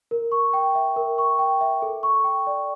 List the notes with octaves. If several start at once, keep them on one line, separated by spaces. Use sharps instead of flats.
A#4
C#6
G5
E5
A#4
C#6
G5
E5
A4
C#6
G5
D5